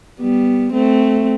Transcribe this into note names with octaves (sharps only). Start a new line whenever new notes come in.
G3 B3
A3 C4